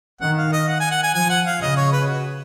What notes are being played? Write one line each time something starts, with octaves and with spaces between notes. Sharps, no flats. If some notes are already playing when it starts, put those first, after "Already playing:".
D#3 F#5
F5
D#5
F#5
G#5
F#5
G#5
F3 G#5
F#5
F5
C#3 D#5
C#5
B4
F#4